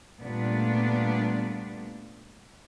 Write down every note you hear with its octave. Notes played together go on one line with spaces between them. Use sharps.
A#2 G3 A3 B3 D4